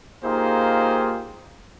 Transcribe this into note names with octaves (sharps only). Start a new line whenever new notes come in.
A#3 D#4 F4 G4 G#4 C5